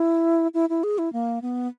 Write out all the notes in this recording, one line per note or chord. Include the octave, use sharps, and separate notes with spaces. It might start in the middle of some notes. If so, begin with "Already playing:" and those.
Already playing: E4
E4
E4
G#4
E4
A#3
B3